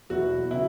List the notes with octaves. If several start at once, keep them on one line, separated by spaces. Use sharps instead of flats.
E2 B2 F#3 E4 F#4
C#3 F#3 B3 E4